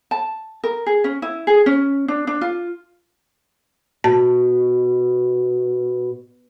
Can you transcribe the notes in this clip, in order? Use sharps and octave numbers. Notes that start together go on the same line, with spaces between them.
A5
A#4
G#4
C#4
E4
G#4
C#4
D4
D4
F4
B2 A5